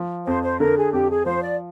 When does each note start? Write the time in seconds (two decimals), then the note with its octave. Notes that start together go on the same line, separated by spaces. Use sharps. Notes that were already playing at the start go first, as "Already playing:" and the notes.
Already playing: F3
0.26 F2 C5
0.43 C5
0.59 D3 A#4
0.77 G#4
0.93 F2 G4
1.10 G#4
1.26 F3 C5
1.43 D5